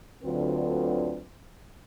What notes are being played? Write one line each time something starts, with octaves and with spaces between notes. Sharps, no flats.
D2 D3 F#3 C4 F4 B4